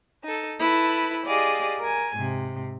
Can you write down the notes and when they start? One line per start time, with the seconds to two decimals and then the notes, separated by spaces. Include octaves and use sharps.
0.23 D#4 A4
0.59 E4 A4 B4
1.25 G4 G#4 D5 D#5 F5
1.79 A#4 G#5
2.16 G#2 C3